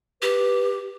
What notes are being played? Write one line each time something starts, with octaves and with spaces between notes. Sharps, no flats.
G4 B4